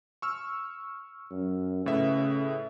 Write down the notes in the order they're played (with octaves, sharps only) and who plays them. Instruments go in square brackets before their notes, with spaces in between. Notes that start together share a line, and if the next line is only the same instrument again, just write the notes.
[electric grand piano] C#6 E6 F6
[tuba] F#2
[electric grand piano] A2 B4 E5 [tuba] C#3